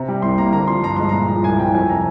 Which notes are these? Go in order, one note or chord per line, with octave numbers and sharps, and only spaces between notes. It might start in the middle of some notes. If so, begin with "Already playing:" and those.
Already playing: C3 A#5
G3
C2 C6
A#3 A#5
D3 A#5
F3 C6
G2 A#5
G#3 C6
A#2 A#5
F3
C2 G#5
C2 G5
F2 G#5
C3 A#5